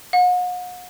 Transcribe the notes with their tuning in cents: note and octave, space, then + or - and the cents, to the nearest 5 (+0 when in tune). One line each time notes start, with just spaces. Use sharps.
F#5 -40